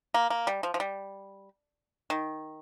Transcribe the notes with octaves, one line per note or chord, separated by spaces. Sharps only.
A#3
A#3
G3
F3
F3
G3
D#3